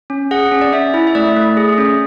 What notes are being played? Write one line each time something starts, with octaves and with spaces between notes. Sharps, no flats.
C#4
G#4 F#5
C#4
D5
C#4 E5
E4
E5
A3 D5
A3
G#4
C#4